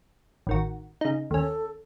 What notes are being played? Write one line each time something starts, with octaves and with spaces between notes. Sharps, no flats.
A1 D#3 F#4
C#3 D#4
D#2 C#4 A4